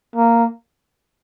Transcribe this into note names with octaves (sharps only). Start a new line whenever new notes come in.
A#3